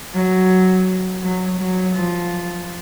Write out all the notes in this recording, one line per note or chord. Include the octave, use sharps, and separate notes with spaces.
F#3
F#3
F#3
F3